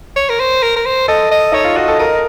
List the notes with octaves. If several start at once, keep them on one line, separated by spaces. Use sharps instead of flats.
C#5
A#4
C5
A#4
A#4
C5
A4 D#5
D#5
D#4 C#5
F4
F#4 D#5
A4
A#4 D#5